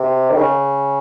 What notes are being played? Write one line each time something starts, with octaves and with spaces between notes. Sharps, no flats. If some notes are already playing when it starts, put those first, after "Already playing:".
Already playing: C3
D#3
C#3